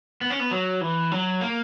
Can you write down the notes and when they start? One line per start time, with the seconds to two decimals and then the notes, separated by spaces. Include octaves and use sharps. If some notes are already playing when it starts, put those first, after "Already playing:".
0.21 B3
0.30 C#4
0.40 B3
0.51 F#3
0.81 E3
1.12 F#3
1.41 A#3